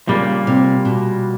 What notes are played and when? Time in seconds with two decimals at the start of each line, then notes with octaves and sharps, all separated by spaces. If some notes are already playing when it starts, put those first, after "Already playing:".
0.08 A#2 C#3 G3 A#3
0.47 C3
0.85 B2